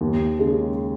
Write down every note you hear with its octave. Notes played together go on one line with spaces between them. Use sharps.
D#2
C#3 G#3 C#4 G#4